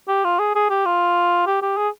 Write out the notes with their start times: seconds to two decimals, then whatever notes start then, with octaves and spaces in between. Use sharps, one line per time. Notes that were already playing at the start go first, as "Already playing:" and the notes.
0.08 G4
0.25 F4
0.39 G#4
0.55 G#4
0.70 G4
0.86 F4
1.46 G4
1.62 G4
1.77 G#4